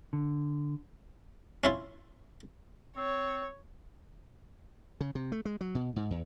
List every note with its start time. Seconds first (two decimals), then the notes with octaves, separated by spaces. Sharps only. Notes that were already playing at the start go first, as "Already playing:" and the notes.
0.13 D3
1.64 C#4 E4 F4
2.97 C4 C#5
5.01 C#3
5.15 C3
5.32 A3
5.45 G#3
5.61 F#3
5.75 B2
5.96 G#2
6.11 E2